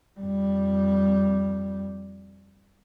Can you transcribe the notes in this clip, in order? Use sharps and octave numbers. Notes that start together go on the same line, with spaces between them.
F2 G3